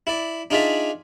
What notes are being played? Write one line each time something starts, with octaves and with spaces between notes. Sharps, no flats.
E4 D5
D4 D#4 F4 G#4 D5 E5